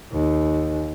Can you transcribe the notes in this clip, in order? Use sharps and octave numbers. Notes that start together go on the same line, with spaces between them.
D#2